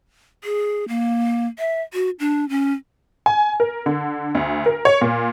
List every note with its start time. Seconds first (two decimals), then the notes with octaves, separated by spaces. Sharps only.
0.44 G#4
0.88 A#3
1.59 E5
1.93 F#4
2.20 D4
2.49 C#4
3.26 G#5
3.60 A#4
3.86 D3
4.35 D2
4.66 A#4
4.85 C#5
5.01 A#2